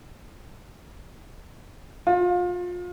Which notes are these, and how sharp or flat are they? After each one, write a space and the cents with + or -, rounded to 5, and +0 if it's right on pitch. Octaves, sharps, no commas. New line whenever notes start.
F4 +30